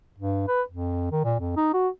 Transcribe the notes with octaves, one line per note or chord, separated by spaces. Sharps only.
G2
B4
F2
D#3
A#2
F2
D#4
F#4